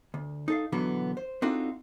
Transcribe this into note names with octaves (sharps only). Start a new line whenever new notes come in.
D2
D#4 A4 F5
B2 D3 E3 F#3 B3
C5
C4 D4 D#4 F4 F#4 A4